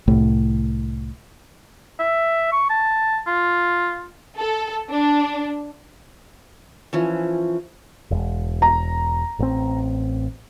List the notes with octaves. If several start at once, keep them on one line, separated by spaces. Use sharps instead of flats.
C2 A2
E5
C#6
A5
F4
A4
D4
E3 F3 C#4
E1
A#5
A1 C4